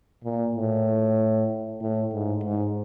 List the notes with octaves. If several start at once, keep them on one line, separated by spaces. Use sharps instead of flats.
A#2
A2
A2
G#2
G#2